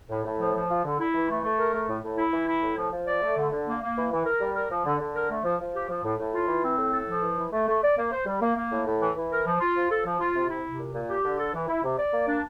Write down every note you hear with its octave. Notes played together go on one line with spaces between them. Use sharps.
A2
A2
F3
F3
F4
D3
E4
E3
A3
A3
A#4
A3
A2
A2
E4
E3
E4
A2
F3
F3
D5
A3
D3
D3
A#3
A#3
E3
E3
A#4
G3
A#4
F3
D3
D3
A#4
A3
F3
F3
G4
F3
A2
A2
F4
E3
C4
A2
A4
F3
E3
E3
A3
A3
D5
A#3
C5
G3
A#3
A#3
A2
A2
E3
E3
A#4
F3
F4
F3
A4
F3
F4
C3
E4
C3
A#2
A#2
G4
D3
A4
E3
E4
C3
D5
A#3
D4